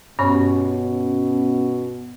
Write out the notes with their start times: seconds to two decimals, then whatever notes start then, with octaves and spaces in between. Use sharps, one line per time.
0.19 G2 B2 C#4